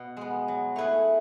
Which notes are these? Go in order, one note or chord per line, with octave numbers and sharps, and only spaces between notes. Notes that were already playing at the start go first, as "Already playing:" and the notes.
Already playing: B2
G#3 B3
F#3
A3 E4 G#4 B4